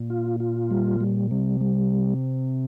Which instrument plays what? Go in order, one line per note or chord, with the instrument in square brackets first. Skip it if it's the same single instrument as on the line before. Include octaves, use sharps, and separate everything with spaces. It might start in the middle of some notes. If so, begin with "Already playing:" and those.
Already playing: [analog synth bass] A#2
[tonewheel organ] F4
F4
G3
G3
[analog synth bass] C3 [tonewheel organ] G3
[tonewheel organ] G3